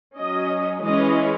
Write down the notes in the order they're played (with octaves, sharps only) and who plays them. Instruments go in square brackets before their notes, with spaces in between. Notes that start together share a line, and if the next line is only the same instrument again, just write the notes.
[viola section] F#3 C#4 D#5
E3 G#3 C#4 D#5